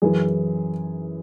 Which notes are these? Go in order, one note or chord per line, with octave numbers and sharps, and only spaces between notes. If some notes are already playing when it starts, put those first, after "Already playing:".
F#2 E3 G#4